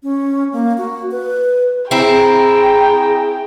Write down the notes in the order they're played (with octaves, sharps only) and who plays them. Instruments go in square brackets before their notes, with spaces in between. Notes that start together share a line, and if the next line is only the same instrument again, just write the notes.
[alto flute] C#4
A#3
F#4
B4
[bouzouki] C4 E4 [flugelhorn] G#4 [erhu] G5 [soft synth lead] A#5